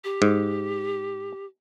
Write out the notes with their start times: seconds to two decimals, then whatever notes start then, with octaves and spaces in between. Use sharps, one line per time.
0.04 G4
0.22 G#2